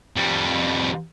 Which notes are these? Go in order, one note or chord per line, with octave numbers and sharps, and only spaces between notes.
F2 G3